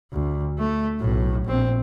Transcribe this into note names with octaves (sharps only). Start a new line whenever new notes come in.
D2
A3
B1 A2
A#1 C4